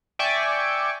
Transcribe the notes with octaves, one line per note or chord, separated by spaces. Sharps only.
D5 E5 G5 G#5 C#6 D6